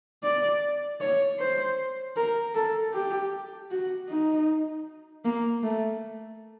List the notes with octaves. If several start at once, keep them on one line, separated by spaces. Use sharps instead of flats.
D5
C#5
C5
A#4
A4
G4
F#4
D#4
A#3
A3